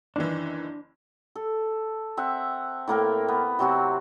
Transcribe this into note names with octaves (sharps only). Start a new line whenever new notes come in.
F#1 D#3 E3 D4
A4
C4 E5 F#5
A2 A#3 A#4 G5
B3
C3 F#3 C4 F#4